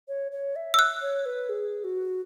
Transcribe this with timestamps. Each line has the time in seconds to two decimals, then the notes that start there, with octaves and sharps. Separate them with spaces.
0.08 C#5
0.32 C#5
0.56 E5
0.74 E6
0.79 F#6
1.02 C#5
1.26 B4
1.49 G#4
1.84 F#4